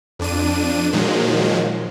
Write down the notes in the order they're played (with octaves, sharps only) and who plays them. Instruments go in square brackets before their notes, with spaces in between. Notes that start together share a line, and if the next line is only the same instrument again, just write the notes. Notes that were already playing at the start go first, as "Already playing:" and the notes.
[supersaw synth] F2 D4 D#7
A#2 D#3 F3 F#3 G#3